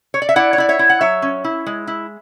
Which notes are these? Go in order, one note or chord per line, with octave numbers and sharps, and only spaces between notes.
C#5
D5
E5
E4 D5 F#5
C#5
E4 D5
C#5 E5
E4
F#5
F#3 C#5 E5
C#4
E4
G#3
E4